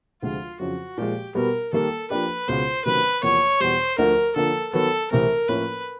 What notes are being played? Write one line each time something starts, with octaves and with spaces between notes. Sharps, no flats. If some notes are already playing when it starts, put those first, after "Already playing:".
D2 C3 F3 G#3 F4
F2 C#3 F#3 F#4
A#2 F3 G#3 G4
B2 G3 B3 A#4
D#3 G3 A#3 A4
F3 A#3 D4 G4 B4
C#2 B2 G#3 B3 C5
C3 D#3 F#3 A3 C#4 B4
E2 C3 F3 A#3 C#5
E2 B2 G3 C5
D2 D3 F3 A3 D4 A#4
D3 F3 A#3 A4
D#3 F#3 B3 A4
C2 C3 E3 A3 C4 A#4
A2 F3 A#3 C#4 E4 B4